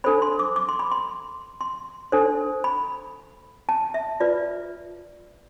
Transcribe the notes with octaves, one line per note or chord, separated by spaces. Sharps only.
D4 A4 C5 B5
C6
D6
D6
C6
B5
C6
C6
D4 A4 C5
B5
A5
E5
F4 B4 D5